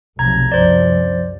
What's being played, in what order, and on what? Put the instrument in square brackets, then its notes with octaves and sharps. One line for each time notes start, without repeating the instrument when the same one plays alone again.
[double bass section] F1 B1 C3 [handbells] A#5 G#6
[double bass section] C2 F#2 F3 [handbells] C5 D5